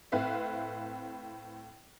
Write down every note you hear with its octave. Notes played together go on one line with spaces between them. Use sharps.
A2 C4 B4 E5 F5